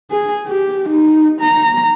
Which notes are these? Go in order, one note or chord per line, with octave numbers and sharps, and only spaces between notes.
G#4
G4
D#4
A#5